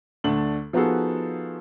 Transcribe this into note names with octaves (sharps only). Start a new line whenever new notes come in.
D2 A3 D4 F#7
F3 B3 D#4 F#4 G#4 A4